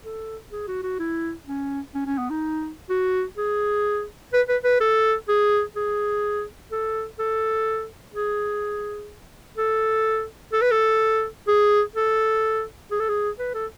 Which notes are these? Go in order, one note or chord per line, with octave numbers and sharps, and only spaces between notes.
A4
G#4
F#4
F#4
E4
C#4
C#4
C#4
B3
D#4
F#4
G#4
B4
B4
B4
A4
G#4
G#4
A4
A4
G#4
A4
A4
B4
A4
G#4
A4
G#4
A4
G#4
B4
A4